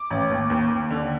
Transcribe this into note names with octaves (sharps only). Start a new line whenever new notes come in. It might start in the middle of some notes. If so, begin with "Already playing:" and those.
Already playing: D6
A1
D#2
D#2
D#2
D3